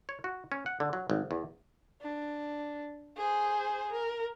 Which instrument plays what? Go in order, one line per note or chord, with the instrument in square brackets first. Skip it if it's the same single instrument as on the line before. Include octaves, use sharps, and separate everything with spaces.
[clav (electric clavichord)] C#5
F#4
C#4
F#5
D3
F#3
G#1
E2
[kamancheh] D4
G#4 C5
A#4